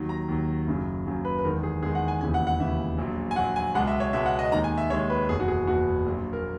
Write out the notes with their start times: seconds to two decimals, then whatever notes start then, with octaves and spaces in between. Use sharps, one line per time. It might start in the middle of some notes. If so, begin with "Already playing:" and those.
Already playing: D#2 D#3 F#3
0.09 A#5
0.28 D#2 D#3 F#3
0.67 F#1 F#2 C#3 F#3
1.06 F#1 F#2 C#3 F#3
1.25 B4
1.38 B4
1.44 E2 D#3 G#3 A#4
1.63 G#4
1.82 E2 D#3 G#3 G#4
1.95 F#5
2.08 G#5
2.21 E1 D#2 C#3 E3 G#5
2.34 F#5
2.47 F#5
2.60 E1 D#2 C#3 E3 E5
2.98 A#1 A#2 F#3
3.31 G#5
3.36 A#1 A#2 F#3 F#5
3.56 G#5
3.74 C#2 B2 G#3 F#5
3.87 E5
4.00 C#5
4.13 C#2 B2 G#3 E5
4.26 F#5
4.39 D#5
4.52 D#2 D#3 G#3 A#5
4.64 G#5
4.78 E5
4.90 D#2 D#3 G#3 C#5
5.10 B4
5.29 F#1 E2 B2 G#4
5.40 F#4
5.48 G#4
5.67 F#1 E2 B2 F#4
6.06 A#1 A#2 F#3
6.33 A#4